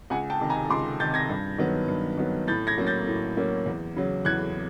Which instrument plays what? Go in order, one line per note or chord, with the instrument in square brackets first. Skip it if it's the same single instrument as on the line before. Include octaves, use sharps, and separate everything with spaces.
[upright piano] C#2 F#5 G#5
G5 A5
C3 D#3
G#5 A#5
C#2 C6 D6
C3 D#3 G6 A6
G#6 A#6
G2
D#3 F#3 B3
G2
D#3 F#3 B3
A2 G6 A6
G#6 A#6
F#3 A#3 C#4
G6 A6
A2
F#3 A#3 C#4
E2
C#3 F#3
E2 F#6 G#6